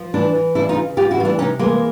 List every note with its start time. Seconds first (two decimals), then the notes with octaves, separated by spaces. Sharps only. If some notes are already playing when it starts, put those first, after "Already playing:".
Already playing: F3
0.14 E3 D4 E4
0.35 E3
0.55 C#3 D4 E4
0.69 D#4 F4
0.76 C#3
0.97 C#3 F4 G4
1.11 E4 F#4
1.18 E3 F4
1.25 D4 E4
1.39 C3 C#4 D#4
1.59 E3 G#3 A#3